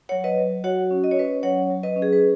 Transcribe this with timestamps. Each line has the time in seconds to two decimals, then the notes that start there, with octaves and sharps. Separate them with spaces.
0.09 F#3 C#5 F#5
0.24 B4 D#5
0.38 F#3
0.64 F#4 C#5 F#5
0.91 C#4
1.04 D#5
1.11 C#5
1.17 C#4 B4 D#5
1.43 F#3 C#5 F#5
1.70 F#3
1.83 B4 D#5
1.96 C#4
2.02 G#4
2.13 B4